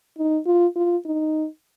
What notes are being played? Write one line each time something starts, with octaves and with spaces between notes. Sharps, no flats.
D#4
F4
F4
D#4